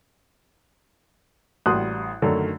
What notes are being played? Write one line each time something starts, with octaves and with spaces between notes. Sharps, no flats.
A1 G3 F#4 C6 D#6 F#6
F#2 D3 D#3 F#3 A3